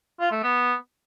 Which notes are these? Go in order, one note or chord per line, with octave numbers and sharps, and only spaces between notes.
F4
A3
B3